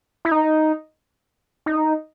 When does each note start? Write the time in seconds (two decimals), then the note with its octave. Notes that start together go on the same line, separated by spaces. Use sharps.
0.25 E4
0.31 D#4
1.66 D#4